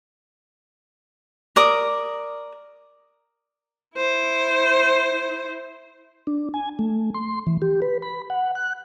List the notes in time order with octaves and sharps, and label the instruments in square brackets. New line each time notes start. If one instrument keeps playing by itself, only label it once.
[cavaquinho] A#4 D5 D#6
[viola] E4 C5
[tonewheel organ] D4
G#5
A3
C6
E3
G4
B4
B5
F#5
F#6